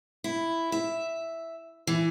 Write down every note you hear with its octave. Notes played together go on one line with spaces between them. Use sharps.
E4
E5
E3